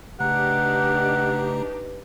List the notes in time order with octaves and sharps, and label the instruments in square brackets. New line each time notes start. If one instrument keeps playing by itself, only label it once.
[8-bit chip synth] C#3 A3 A#5 [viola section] D4 D#4 G4 [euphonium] B4 [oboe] F#5